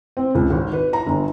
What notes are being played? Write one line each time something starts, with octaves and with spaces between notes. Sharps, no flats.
C4
C#2
G#1
B4
A#5
G1